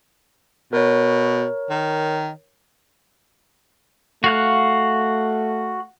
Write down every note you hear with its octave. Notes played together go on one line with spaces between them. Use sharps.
B2 A#4 C#5
D#3
A3 F#4 F5 F#6